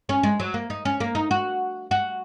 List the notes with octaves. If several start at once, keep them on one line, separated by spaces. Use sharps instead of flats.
C#4
G#3
F#3
A#3
D#4
C#4
A#3
D#4
F#4
F#4